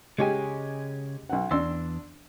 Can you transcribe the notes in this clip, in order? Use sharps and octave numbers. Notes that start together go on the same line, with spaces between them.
C#3 G#3 G4 C#5 G#5
B1 F#5
E2 D4 C6 E6